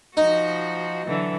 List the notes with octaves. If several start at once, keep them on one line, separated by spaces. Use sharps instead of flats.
F3 D#4 F#4
D3 E3 F#3